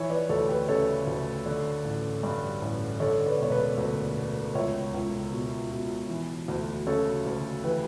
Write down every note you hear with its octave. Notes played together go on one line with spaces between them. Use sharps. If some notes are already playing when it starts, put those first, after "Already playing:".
Already playing: E3 C#5 E5
B4 D5
D2 A4 C#5
G4 B4
C#3 A4 C#5
D2
D3
A1
G2
A1
D3 A4 C#5
B4 D5
E1 C#5
B4 D5
D2
E1
C#2 C#5 E5
C#2
B2
B2
E3
D2
C#3 A4 C#5
D2
E3 G4 B4